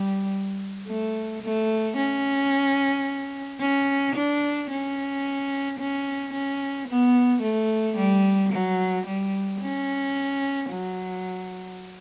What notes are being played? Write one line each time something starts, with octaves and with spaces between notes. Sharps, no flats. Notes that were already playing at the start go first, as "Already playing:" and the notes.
Already playing: G3
A3
A3
C#4
C#4
D4
C#4
C#4
C#4
B3
A3
G3
F#3
G3
C#4
F#3